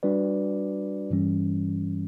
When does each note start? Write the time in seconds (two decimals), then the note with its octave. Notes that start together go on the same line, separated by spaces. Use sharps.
0.03 G3 D4 F#4 B4 D5
1.10 G2 E3 G3 C#4